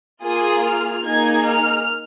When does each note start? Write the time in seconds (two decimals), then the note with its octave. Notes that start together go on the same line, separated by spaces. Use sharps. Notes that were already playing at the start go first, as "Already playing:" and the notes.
0.23 A#3 F4 G#4 D#6
0.64 F6
1.05 A#3 D#4 G#4 G#6
1.46 F6